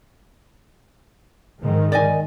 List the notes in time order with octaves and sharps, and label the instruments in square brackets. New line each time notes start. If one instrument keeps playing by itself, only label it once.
[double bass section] G#2 D#3
[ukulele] D5 D#5 G#5